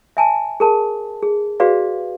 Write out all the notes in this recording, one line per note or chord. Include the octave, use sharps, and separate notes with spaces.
E5 G#5 A5
G#4 A#4 A5
G#4
F#4 G#4 B4 D5 F5